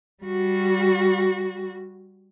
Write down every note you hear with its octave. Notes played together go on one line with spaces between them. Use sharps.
G3 F#4